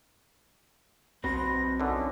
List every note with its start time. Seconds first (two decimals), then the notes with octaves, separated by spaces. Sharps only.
1.24 B1 C4 F#4 B4 A#6
1.80 F#2 D3 D#4